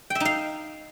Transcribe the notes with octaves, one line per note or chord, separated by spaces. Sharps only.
G5
E5
D#4
F5